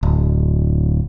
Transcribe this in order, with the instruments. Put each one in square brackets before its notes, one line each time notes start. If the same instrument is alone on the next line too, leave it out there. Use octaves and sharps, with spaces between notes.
[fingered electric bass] D1